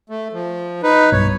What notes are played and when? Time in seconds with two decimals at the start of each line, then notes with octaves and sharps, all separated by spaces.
0.09 A3
0.32 F3
0.83 D#4 B4
1.12 B1 G2 B2 C#5